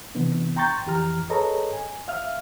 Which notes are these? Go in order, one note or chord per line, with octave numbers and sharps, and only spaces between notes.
C3 E3 B3 D4
G5 A#5 C6 C#6 G6 A6
F2 E3 G4 A#5 F6
G#4 A4 B4 C#5 D#5 A#5
G#5
E5 F5 F6